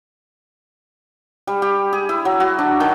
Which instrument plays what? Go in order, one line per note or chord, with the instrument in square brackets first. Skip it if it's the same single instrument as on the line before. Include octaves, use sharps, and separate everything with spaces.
[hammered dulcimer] G3
G4
G#4
E4
F#3
F#4
D4
D#3